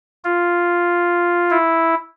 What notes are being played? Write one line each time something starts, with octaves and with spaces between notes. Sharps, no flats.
F4
E4